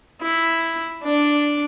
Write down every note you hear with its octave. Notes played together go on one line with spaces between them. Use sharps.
E4
D4